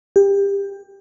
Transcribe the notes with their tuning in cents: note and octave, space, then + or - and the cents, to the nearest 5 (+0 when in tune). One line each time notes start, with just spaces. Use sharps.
G4 +25